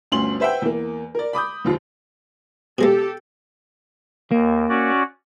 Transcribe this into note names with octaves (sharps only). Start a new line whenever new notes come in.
G1 D2 C#4 C6 F#7
B4 C5 E5 F#5 G5
E2 A#3
A#4 D5
B5 D6 D#6 G6
F#1 D#2 F4
B2 G#3 A#3 G4 A4
D#2 A#3
C#4 F#4 D5